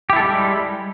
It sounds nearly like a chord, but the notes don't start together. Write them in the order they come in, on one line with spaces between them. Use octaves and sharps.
G4 E4 A4 G#3 G3